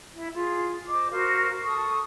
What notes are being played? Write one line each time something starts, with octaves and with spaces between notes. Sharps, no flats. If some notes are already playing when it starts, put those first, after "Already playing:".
E4
F4 G#4
C5 D#5 D6
F#4 A#4 C5 F5
A4 A5 C#6 D#6